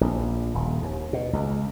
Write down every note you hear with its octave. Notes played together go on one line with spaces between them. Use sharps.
A#1
D#1
D#2
B2
C#2